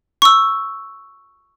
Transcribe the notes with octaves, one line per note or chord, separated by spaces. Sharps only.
C#6 E6